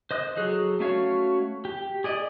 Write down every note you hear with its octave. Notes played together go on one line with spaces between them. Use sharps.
C5 D#5 D#6 F#6
F#3 G#4 A4
A3 C#4 F#4 C#5 F5
G4
G#4 D5 D#5